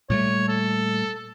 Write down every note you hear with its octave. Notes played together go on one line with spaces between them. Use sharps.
A#2 G3 A3 C#5
A4